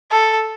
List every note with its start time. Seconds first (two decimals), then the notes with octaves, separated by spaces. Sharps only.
0.11 A4